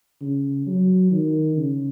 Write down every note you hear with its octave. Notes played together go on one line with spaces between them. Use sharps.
C#3
F#3
D#3
C#3